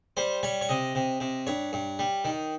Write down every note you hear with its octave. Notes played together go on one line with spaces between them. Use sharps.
G3 C5
G3 C#5
C#5
C3 D#5
C3
C3
G2 C#5
G2
G3
D#3